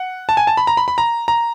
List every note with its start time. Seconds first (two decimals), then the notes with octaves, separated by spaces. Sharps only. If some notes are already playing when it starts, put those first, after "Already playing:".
Already playing: F#5
0.29 A5
0.37 G#5
0.47 A5
0.57 B5
0.67 A#5
0.77 B5
0.88 B5
0.98 A#5
1.28 A#5